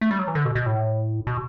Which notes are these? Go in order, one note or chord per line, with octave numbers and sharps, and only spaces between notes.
A3
G3
F#3
E3
D3
B2
B2
A2
B2